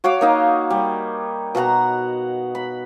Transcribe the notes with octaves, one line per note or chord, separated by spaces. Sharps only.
F#4 C#5 F5 D6
A#3 D#4 D#5
G3
B2 F#4 F#5 A#5
B5